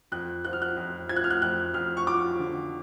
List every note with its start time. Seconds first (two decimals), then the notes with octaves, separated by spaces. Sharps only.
0.12 F2 F#6
0.45 F3 F#6
0.53 F6
0.62 F#6
0.77 F2
1.09 F3 G#6
1.16 F#6
1.24 F6
1.30 F#6
1.42 F2 F#6
1.74 F2 F6
1.97 C#6
2.07 F3 D6
2.39 D3